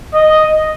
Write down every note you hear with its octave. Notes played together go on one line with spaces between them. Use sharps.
D#5